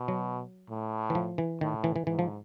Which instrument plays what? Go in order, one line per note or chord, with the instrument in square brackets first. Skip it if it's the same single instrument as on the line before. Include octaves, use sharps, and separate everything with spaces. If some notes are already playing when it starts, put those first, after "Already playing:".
Already playing: [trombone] B2
[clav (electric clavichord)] F#3
[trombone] A2
[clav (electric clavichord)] E3
F3
E3
[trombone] A2 [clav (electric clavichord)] D#3
[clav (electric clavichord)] E3
E3
[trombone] G#2 [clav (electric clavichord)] E3
[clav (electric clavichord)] F3